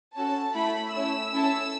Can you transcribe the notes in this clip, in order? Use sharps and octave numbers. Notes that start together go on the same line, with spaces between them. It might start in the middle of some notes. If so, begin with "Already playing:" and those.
C#4 F#4 A4 A5
A3 E4 A4 B5
A3 C#4 E4 E6
C#4 E4 A4